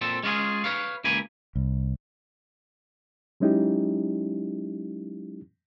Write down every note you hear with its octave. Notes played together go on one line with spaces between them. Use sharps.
A#2 C4 A4
G#3 C#4 F4 F#4 G#4
B4 C#5 F5
C#2 A#3 G#5 B5
C2
F#3 G#3 C#4 D#4 E4 G4